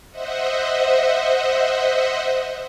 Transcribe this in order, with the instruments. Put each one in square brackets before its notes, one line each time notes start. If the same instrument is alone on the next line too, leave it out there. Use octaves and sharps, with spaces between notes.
[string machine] C5 D#5 E5 F#5